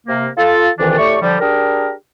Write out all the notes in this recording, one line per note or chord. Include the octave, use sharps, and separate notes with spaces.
C3 A#3
F4 A4
C2 F2 D#3 E3 D4
A2 A3 G4 D5 C#6
D3 F3 G3
D4 G4 G#4 A#4